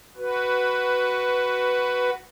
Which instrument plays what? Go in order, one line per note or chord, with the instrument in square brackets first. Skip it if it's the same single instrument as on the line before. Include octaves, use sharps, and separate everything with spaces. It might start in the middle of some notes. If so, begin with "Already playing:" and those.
[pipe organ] F#4 B4